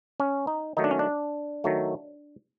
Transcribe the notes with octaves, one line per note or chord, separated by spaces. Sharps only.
C#4
D#4
D#3 F#3 A3 D#4
D4
C#4
D4
D#3 F#3 A3